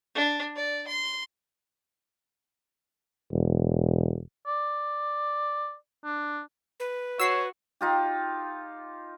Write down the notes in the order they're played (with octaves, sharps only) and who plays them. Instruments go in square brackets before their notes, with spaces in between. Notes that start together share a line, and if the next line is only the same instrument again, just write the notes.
[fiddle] D4
D5
C6
[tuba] E1
[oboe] D5
D4
[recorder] B4
[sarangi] F#4 [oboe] C#5 [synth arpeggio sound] E6 C7
[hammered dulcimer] D#4 F4 G4